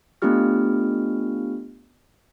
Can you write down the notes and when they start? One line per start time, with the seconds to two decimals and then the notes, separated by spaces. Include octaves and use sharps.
0.22 A3 B3 D4 F4 G4 F6